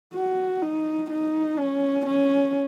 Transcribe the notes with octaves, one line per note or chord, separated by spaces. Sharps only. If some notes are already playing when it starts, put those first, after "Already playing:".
F#4
D#4
D#4
C#4
C#4